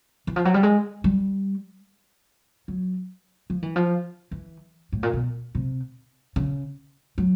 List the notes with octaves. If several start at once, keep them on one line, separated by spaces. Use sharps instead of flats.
E3
F3
F#3
G3
G#3
G3
F#3
F3
E3
F3
E3
A2
A#2
B2
C3
C#3
F#3